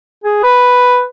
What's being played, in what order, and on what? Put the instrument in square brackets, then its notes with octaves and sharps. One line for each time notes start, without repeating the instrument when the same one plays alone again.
[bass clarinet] G#4
B4